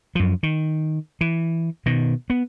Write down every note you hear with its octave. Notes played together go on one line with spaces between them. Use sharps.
F#2 F3
D#3
E3
B2 D#3
B3